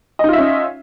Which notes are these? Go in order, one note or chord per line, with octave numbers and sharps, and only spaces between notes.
C#4 D#4 F4 D#5 E5